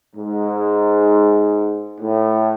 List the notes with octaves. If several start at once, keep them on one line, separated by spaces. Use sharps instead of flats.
G#2
A2